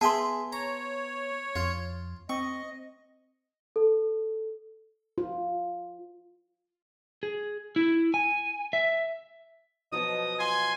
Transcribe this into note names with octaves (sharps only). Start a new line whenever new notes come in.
B3 G#4 E5 G5 A5 C6
C#5 A#5
F2 F4
C4 D#5 C#6
A4
F4
G#4
E4
G#5
E5
B2 F3 F#3 D#5 D#6
F4 G#5 C6